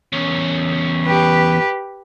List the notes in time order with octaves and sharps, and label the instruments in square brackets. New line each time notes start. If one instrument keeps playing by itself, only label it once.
[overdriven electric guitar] E2 C#4
[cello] G4 B4